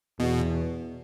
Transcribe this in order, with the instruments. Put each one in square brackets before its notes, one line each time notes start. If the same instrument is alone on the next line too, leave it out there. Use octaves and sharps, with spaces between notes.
[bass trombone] E2 [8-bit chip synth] B2